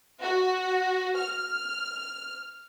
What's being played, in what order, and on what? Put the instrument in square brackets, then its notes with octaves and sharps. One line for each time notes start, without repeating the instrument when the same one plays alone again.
[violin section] F#4
F6